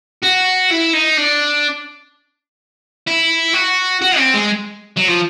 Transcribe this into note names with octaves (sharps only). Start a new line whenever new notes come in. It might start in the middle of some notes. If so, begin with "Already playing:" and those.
F#4
E4
D#4
D4
E4
F#4
F#4
C4
G#3
F#3
F3